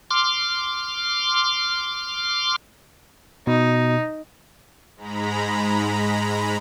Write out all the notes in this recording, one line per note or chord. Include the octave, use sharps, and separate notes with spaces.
C6 D6 F6
B2 D#4
G#2 G#3 A#5 B5